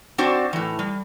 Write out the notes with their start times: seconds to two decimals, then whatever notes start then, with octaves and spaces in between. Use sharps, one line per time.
0.18 C4 D4 F#4 C5 D5
0.53 A2 E3
0.79 G3